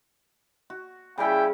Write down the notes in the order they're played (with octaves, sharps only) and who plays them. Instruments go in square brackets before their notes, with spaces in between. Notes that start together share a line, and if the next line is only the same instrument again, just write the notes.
[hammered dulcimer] F#4
[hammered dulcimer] C#3 G3 C#4 [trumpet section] E4 G5